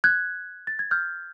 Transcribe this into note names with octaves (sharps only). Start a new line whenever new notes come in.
F#6 G#6
A6
G#6
F6 G6